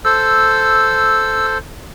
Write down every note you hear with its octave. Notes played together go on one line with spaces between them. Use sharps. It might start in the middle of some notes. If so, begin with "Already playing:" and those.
A4 C5 E6